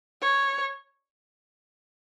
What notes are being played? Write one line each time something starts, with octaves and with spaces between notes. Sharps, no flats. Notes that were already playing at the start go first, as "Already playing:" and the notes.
C#5